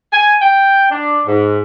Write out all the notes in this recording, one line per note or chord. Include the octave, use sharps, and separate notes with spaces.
G#5
G5
D4
G#2